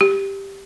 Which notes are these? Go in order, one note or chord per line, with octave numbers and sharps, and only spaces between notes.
G4